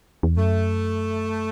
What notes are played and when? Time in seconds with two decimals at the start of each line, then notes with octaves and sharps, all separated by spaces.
0.23 E2
0.37 F#2 A3